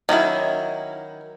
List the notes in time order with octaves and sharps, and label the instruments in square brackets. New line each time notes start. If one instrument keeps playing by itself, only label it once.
[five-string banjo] D#3 F#3 C#4 E4